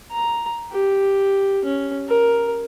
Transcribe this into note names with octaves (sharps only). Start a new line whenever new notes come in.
A#5
G4
C#4
A#4